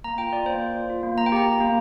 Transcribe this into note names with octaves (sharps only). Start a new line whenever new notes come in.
A#3 A#5
F4 G5
F4 D5
A#3 C5
A#3
F4
F4
A#3
A#3 A#5
G5
G4 A#5
G4
A#3